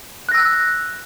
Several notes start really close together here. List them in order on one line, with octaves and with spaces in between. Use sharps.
F#6 A#6 E6